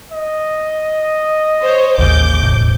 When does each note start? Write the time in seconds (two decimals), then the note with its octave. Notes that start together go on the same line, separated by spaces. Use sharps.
0.12 D#5
1.63 C5 C#5
1.98 A1 D#2 C#3 D6 G6
2.43 E1 A2